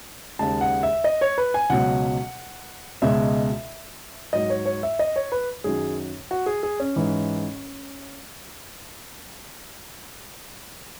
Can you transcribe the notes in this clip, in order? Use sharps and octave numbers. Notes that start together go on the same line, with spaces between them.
D#2 C#3 G#3 A5
F#5
E5
D#5
C#5
B4
G#5
C#2 B2 F#3 F#5
C#2 B2 G#3 E5
G#2 F#3 D#5
C#5
C#5
E5
D#5
C#5
B4
F#2 D#3 F#3 G#4
F#4
G#4
G#4
C#4
G#2 E3 G#3